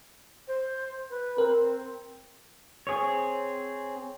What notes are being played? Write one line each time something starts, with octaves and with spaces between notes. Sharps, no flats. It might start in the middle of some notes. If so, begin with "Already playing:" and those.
C5
B4
C4 A#4
C4 G#4 C#5